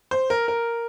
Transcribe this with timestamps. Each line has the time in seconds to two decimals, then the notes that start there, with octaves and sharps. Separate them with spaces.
0.11 C5
0.30 A#4
0.48 A#4